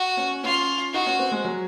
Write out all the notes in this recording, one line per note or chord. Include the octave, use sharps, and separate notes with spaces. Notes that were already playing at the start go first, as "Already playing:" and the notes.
Already playing: F#4
C#4
C#4 F4
D#4 F#4
C#4
C4
G#3
F#3